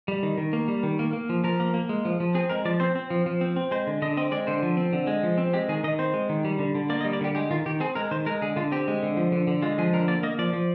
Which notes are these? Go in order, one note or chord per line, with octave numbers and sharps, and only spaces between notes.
G3
D#3
D#3
A#3
G3
D#3
A#3
A#3
F3
F3 A#4
A#3
A#3
G#3
F3
F3
C4 G#4
G#3 A#4
F3 D5
C4 C5
C4
F3
F3
C4
C4
G#3 C5
D3
D3 D#5
C4 D#5
G#3 D5
D3 C5
F3
C4
D3
G#3
F3
C4
G#3 G4
D#3 G#4
D#3 D#5
C4 C5
G#3
D#3
G3
D3
D3
A#3 D5
D#5
G3
D5
D3 G4
G#3 G4
D#3 F4
D#3 G4
C4 G#4
G#3 A#4
D#3 C5
G#3 A#4
D3 G#4
D3 F4
C4 G4
G#3
D3
F3
D3
D3
G#3 F4
F3 G#4
D3 A#4
A#3 D5
A#3 D#5
F3 D5
F3